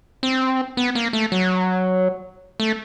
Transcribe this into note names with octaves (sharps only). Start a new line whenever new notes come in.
C4
B3
A#3
A3
F#3
A3